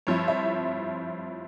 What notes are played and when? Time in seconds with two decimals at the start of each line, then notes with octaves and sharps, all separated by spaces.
0.07 G2 F3 C4 E4 C#5
0.28 E5